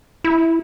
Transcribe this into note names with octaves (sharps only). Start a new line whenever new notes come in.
E4